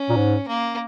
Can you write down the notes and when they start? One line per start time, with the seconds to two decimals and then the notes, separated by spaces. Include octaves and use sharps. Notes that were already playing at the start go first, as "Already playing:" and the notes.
Already playing: C#4
0.09 A#2
0.16 G#2
0.48 A#3